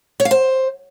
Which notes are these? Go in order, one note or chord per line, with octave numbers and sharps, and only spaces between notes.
C#5
F5
C5